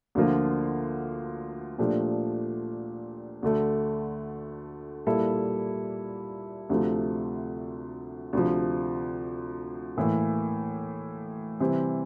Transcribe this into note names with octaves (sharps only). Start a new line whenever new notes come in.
D2 D3 F3 A#3 F4
A#2 F3 A3 D4 G4
D2 D3 A3
A#2 G3 A#3 E4 A4
D2 C3 F3 A3
D2 C3 F3
A2 E3 A#3
C3 E3 G3 C4 G4